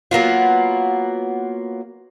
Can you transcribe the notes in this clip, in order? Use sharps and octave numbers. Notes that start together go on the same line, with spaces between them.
F#3 A#3 B3 F4